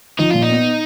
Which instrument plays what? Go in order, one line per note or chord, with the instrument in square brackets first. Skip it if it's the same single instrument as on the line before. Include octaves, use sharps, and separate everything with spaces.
[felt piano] F3 [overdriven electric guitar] D#4
[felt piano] A#2 [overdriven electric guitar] F4
[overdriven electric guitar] D#4
[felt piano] B3